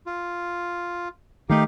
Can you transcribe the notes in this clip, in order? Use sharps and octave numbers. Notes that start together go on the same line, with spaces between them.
F4
D#3 A3 D#4 G4 F5